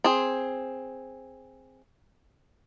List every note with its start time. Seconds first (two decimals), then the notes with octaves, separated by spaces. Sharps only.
0.04 C4 G#4